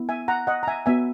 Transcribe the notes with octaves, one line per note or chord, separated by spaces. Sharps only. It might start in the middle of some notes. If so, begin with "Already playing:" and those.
Already playing: B3 E4
E5 G#5
F#5 A#5
D#5 F#5
A#5
E5 G#5
B3 F#4 E5 G#5